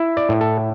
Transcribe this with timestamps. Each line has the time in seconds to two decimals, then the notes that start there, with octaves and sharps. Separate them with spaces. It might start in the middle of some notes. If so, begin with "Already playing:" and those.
Already playing: E4
0.17 D5
0.29 A2
0.41 A4